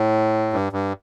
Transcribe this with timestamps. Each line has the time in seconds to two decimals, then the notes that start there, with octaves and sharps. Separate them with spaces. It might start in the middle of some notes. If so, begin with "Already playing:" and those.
Already playing: A2
0.53 G2
0.73 G2